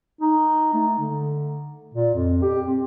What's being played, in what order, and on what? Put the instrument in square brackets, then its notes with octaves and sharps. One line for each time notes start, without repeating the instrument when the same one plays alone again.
[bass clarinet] D#4
A3
D3
A#2
F2
G4
C4